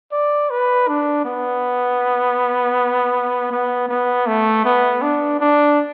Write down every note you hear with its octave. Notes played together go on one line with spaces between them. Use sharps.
D5
B4
D4
B3
B3
B3
A3
B3
D4
D4